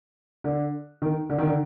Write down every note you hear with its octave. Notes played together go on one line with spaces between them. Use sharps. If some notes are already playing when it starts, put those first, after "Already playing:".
D3
D#3
D3
D#3
D3